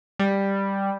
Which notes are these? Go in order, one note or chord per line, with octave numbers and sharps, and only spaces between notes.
G3